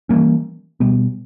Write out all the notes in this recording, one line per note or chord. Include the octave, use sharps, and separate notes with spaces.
E3 G3 A#3 C#4
B2 G3 B3